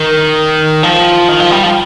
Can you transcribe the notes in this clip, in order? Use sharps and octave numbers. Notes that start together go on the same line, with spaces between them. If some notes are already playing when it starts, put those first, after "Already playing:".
Already playing: D#3
F3
D#3
F3
G3
F3